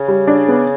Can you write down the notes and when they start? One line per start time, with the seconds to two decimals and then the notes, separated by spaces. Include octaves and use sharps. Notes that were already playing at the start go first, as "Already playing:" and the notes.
Already playing: C#3
0.08 G3
0.27 D4
0.48 B3